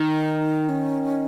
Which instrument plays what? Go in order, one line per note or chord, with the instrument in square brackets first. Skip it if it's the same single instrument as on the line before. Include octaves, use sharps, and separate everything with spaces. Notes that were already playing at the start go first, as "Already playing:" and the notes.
Already playing: [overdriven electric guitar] D#3 [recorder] D#4
[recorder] C#4